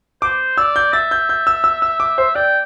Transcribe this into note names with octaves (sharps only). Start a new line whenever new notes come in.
C5 D6
D5 E6
G6
E5 A6
G6
G6
E6
E6
E6
D6
C5
D5 G5